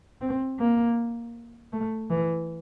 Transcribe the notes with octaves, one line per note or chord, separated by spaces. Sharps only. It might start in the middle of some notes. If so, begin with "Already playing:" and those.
C4
A#3
A3
E3